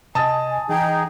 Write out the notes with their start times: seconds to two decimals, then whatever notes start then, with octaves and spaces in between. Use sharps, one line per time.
0.15 C3 D#5 G#5 A5 D#6 A6
0.69 E3 D#4 G#4 G5